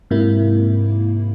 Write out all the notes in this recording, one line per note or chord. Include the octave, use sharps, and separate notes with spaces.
G#2 C3 A#3 E4